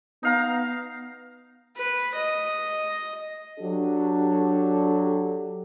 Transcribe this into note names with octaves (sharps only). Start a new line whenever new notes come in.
B3 D#4 F5 A#5
B4
D#5
F#3 D4 G4 A4